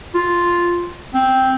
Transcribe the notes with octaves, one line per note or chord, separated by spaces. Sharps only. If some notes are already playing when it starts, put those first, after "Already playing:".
F4
C4